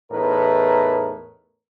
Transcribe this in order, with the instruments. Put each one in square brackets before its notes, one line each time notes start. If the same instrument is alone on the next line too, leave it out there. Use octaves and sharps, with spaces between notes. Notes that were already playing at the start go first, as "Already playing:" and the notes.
[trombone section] E2 A2 D#4 A#4 B4